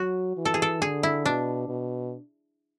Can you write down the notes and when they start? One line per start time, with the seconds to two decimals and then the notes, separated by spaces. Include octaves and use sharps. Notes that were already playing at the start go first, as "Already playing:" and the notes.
Already playing: F#3 F#4
0.37 E3
0.45 A4
0.54 G#4
0.62 A4
0.81 D3 G#4
1.03 E4
1.26 B2 D4
1.69 B2